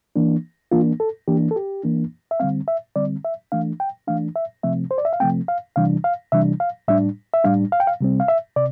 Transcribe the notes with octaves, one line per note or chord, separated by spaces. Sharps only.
E3 A#3 D4
E3 A#3 D4 F4
A4
E3 A#3 D4 G4
A4
G4
E3 A#3 D4
E5
D3 G3 C4 F5
E5
D3 G3 C4 D5
E5
E3 A3 D4 F5
G5
E3 A3 D4 F5
E5
C3 F3 A3 C4 E5
C5
D5
E5
F5
C3 F3 A3 C4 G5
F5
C3 E3 G3 D4 F5
F5
C3 E3 G3 D4 E5
F5
A2 G3 D4 E5
E5
A2 G3 D4 F5
F5
G5
F5
C3 G3 C4
F5
E5
C3 D5